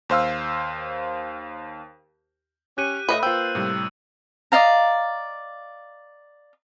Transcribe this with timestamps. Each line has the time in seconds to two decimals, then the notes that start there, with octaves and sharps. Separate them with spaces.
0.09 D#2 C5 F5 E6
2.78 C#4 G4 F#6 D#7
3.09 A2 B4 D#5 E5
3.23 A#3 F4 B4 C5 G5 E6
3.55 A2 C3 G3
4.52 D5 D#5 F5 A#5